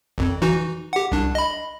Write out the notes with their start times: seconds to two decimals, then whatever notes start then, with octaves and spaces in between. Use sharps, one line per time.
0.18 G#1 F2
0.42 E3 D#4 F#4
0.93 G4 F#5
1.12 C2 D4
1.35 D#5 B5